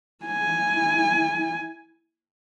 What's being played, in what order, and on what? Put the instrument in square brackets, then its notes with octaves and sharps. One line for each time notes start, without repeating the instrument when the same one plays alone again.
[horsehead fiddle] E4 G#5